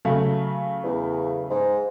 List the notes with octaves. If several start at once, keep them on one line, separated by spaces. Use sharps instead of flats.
C#3 F#3 A3
E2
G#2